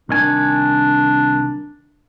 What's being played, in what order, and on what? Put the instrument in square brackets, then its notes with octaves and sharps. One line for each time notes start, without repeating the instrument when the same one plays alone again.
[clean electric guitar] C2 D#3 G#5 [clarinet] D4